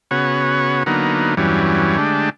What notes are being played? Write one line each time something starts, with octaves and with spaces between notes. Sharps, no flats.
C#3 B3 F#4 C#5
D3 F#3 A#3 B3 D#4
E2 G2 E3 F#3 G3 C#4
D3 G#3 A3 D4 G4